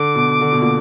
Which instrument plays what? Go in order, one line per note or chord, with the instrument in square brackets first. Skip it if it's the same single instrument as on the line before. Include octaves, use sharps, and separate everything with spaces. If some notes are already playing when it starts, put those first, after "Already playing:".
Already playing: [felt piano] D3 [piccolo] D6
[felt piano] B2
D3
B2
A#2